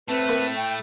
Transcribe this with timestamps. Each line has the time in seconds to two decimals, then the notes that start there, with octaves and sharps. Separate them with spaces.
0.08 A2 A3 C4 B4
0.29 A#3
0.56 G5